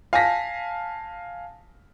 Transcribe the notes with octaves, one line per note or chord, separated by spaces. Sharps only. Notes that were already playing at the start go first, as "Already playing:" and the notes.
F5 G#5 A5 A#6 B6